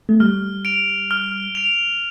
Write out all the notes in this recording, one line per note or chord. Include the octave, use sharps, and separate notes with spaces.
A3
G3 F6
D7 F7
F6
D7 F7